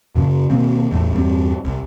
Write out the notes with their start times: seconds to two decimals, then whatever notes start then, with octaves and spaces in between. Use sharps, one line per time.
0.15 F#2 C#3
0.50 B2 D#3 A#3 C4
0.91 A1 E2 A2 A3
1.13 E2 G2 G3 C4
1.64 C2